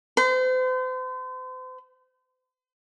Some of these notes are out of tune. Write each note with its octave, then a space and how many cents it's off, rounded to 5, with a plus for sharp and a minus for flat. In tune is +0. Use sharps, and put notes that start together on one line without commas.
C5 -40